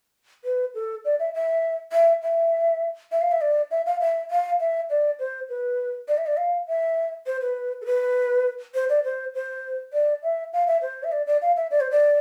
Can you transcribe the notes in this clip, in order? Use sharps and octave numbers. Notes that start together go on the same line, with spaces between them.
B4
A4
D5
E5
E5
E5
E5
E5
F5
E5
D5
E5
F5
E5
F5
E5
D5
C5
B4
D5
E5
D5
F5
E5
C5
B4
A4
B4
C5
D5
C5
C5
D5
E5
F5
E5
C5
E5
D5
D5
F5
E5
D5
C5
D5